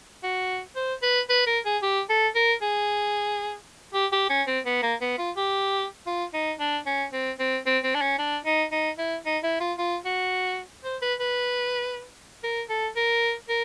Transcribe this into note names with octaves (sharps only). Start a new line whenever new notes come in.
F#4
C5
B4
B4
A#4
G#4
G4
A4
A#4
G#4
G4
G4
C#4
C4
B3
A#3
B3
F4
G4
F4
D#4
D4
C#4
C4
C4
C4
C4
D4
C#4
D4
D#4
D#4
E4
D#4
E4
F4
F4
F#4
C5
B4
B4
A#4
A4
A#4
A#4